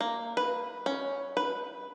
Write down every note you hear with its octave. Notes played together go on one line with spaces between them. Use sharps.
A#3
B4
C#4
B4